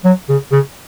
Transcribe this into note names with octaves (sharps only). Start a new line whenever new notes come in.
F#3
C#3
C#3